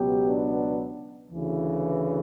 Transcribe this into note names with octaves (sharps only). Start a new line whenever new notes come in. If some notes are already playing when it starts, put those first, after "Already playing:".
Already playing: C#2 B2 F#3 B3 G4
D4
D2 C#3 E3